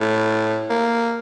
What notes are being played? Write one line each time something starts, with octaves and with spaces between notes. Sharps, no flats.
A2
A#3